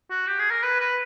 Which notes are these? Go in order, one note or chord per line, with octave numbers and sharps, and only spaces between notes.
F#4
G4
G#4
A#4
B4
B4